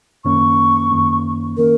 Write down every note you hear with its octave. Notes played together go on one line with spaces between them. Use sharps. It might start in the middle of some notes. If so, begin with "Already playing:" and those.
F#2 D#3 A#3 C#4 C#6
F#2 D#3 A#3 C#4
D#3 A#3 C#4 A#4